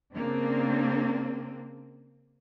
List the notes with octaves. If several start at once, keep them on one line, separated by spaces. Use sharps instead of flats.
C#3 A#3 C4 D4